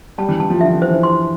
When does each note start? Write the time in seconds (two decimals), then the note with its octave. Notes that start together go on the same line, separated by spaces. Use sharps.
0.18 G3 A5
0.29 E3
0.40 E3 A5
0.50 F3
0.61 D3 E5
0.75 E3
0.82 C5
0.89 E3
1.03 C6